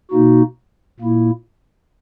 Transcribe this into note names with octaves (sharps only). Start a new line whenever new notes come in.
B2 A#3 D#4 F#4
A#2 A#3 E4